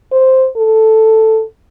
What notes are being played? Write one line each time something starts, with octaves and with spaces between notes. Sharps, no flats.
C5
A4